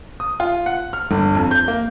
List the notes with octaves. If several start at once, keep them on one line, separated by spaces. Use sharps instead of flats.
D#6
F4
F#5
F6
G1
F2
G6
A#3